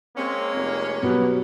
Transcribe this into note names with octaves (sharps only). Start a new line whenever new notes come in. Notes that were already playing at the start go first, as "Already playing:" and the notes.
G#3 A#3 C4 C#4
F1
B2 F#3 G3 B3